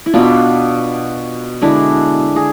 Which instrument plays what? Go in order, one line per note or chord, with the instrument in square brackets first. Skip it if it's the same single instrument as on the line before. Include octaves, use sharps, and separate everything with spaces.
[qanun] E4
B2 B3 D4 F4
D3 G#3 D4 E4
G#4